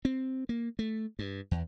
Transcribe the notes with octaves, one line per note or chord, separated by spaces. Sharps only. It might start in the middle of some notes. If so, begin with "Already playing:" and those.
C4
A#3
A3
G2
E2